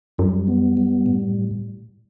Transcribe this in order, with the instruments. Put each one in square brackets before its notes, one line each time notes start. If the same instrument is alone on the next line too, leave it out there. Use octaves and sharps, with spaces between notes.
[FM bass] F#2 [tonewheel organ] G3
[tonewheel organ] B3
G3
A2